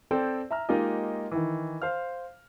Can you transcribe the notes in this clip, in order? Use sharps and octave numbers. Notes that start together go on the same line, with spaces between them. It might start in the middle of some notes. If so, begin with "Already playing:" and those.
C4 A4 C5 D5 G5
E5 A#5 F6
G#3 A#3 D#4 F4 G4 D#5
D#3 E3
C5 F5 F6